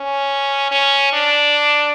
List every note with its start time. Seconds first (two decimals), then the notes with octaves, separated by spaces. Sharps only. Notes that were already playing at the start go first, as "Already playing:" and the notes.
Already playing: C#4
0.72 C#4
1.13 D4